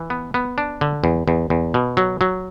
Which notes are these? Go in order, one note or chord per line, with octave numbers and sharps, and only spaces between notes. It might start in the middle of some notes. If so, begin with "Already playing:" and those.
Already playing: E3
B3
B3
D4
D3
E2
E2
E2
B2
F#3
F#3